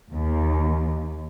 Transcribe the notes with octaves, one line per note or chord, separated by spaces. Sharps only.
D#2